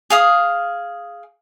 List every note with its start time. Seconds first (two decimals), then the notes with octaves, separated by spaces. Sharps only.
0.10 G#4 F5 D#6